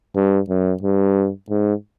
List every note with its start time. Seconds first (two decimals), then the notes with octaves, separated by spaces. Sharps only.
0.16 G2
0.49 F#2
0.83 G2
1.50 G#2